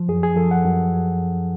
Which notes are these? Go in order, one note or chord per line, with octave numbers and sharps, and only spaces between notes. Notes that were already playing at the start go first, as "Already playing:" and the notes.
Already playing: F3
F#2 G#4
G#4
F3 A4
F#5
F#2